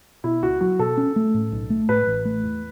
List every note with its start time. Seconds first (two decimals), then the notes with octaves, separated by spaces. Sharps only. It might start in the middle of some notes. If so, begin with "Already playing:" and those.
0.24 B2 E4
0.42 C#2 F#4
0.61 F#3 F#4
0.79 B2 A4
0.97 C#4
1.16 A3
1.34 A2
1.52 B1
1.70 A3
1.89 A2 B4
2.07 A1
2.25 A3
2.43 E2